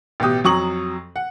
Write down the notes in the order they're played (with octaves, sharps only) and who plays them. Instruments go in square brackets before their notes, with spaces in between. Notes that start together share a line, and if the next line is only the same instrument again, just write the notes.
[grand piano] A1 B2 G4 D#6
F2 F#3 A#5 C#6 D#6 F#7
F#5